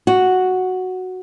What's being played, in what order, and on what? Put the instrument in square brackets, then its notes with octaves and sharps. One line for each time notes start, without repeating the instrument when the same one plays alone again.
[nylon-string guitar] F#4